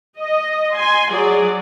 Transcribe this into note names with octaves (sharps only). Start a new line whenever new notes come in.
D#5
G#5 C6
F#3 G#4 D5